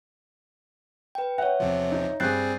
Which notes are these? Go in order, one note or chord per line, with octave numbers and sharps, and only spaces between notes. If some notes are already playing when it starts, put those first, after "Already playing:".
B4 G5
C#5 E5 F#5
E2 C3 F3
D#4
G2 G3 C4 G#4 F#6 G6 A6 C7